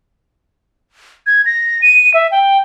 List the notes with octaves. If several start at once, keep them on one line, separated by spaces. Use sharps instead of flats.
G#6
A#6
D#7
E5
G5